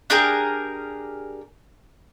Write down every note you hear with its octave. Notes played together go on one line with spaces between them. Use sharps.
D4 G4 G#4 A#4